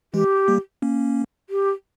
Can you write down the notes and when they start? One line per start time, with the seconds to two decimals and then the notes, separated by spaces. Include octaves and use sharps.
0.14 E3 G#3 G4
0.48 G3 A#3
0.82 A#3 C#4
1.50 G4